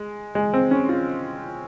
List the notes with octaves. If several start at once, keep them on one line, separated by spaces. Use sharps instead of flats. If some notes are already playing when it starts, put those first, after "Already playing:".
Already playing: G#3
G#3
C4
C#4
F4